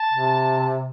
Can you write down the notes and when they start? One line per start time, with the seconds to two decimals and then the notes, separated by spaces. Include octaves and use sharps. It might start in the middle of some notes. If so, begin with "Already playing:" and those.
Already playing: A5
0.12 C3